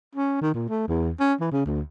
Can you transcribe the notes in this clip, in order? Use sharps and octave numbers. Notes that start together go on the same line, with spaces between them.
C#4
D#3
A#2
A3
E2
C#4
E3
C#3
D2